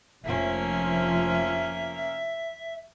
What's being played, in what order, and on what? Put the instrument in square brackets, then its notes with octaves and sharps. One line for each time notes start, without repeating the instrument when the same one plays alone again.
[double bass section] F1 F3 [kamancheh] A#3 C#4 [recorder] E5